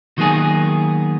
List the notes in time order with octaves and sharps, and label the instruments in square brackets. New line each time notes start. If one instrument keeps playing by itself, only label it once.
[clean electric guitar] D#3 F#3 A#3 B3 G#4